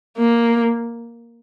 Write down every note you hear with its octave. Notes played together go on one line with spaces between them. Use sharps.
A#3